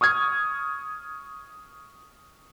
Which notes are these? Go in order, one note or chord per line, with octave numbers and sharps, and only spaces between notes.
C#6 D#6 F6 G#6